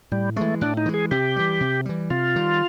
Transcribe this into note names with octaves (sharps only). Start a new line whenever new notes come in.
A2 G3
E3 G#3 A3
A2 D4
D#4
E3 G#3
G#4
C3 G4
E3 G3
C3
E3 G3
C3 F4
D#3 G3